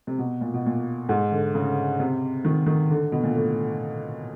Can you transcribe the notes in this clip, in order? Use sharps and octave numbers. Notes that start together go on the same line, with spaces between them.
C3
B2
A#2
B2
A#2
G#2
D3
C#3
C3
D#3
D#3
D3
B2
A#2
A2